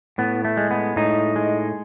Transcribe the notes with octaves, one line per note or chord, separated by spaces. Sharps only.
A2 B3
A3
G#3
B3
A2 D#4
G#3